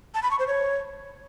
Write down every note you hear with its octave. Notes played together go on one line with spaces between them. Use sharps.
A5
B5
C#6
C5
C#5